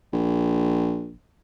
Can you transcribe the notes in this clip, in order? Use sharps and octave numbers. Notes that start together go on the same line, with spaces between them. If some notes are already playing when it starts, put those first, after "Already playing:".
A#1